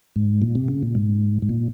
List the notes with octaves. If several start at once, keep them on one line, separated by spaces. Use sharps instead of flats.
G#2
A#2
C3
C#3
A#2
G#2
G#2
A#2